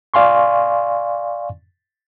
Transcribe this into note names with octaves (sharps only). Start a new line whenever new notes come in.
D5 F5 G#5 C6 C#6